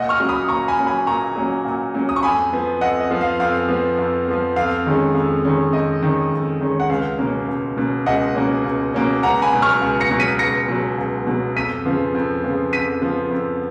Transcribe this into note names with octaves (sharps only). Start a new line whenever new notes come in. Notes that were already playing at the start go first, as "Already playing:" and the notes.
Already playing: A#2 D#5 F#5
C#6 F6
F#3 A#3 C#4
B5 D#6
A#2 A#5 C#6
G#5 B5
F#3 A#3 C#4
G#5 B5
A#2 A#5 C#6
F#3 A#3 C#4
A#2
F#3 A#3 C#4
D#6
C#6
F2 G#5 B5
F3 B3
F2 D#5 F#5
D#5
F3 B3
F5
F2 F5
F3 B3
F2
F3 B3
F2 F5
D#3 G#3 C#4
F2
D#3 G#3 C#4
F2 D#5
D#3 G#3 C#4
F2
D#3 G#3 C#4
F#5
C#2 F5
B2 A#3 C#4
C#2
B2 A#3 C#4
C#2 D#5 F#5
B2 A#3 C#4
C#2
B2 A#3 C#4
C#2 F#5 A#5
G#5 B5
B2 F#3
C#6 F6
C#2
A#6 C#7
B2 F#3
B6 D#7
C#2 A#6 C#7
B2 F#3
C#2
B2 F#3
F2 B6 D#7
C#3 F3 B3
F2
C#3 F3 B3
F2 B6 D#7
C#3 F3 B3
F2